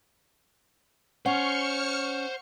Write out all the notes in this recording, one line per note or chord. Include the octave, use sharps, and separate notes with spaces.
C#4 C5 F#5 C#6 F6 C#7